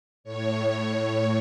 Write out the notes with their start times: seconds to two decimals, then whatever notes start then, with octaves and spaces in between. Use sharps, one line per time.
0.24 A2 C#5